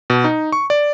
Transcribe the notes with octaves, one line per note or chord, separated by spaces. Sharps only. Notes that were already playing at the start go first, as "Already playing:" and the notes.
B2
D#4
C#6
D5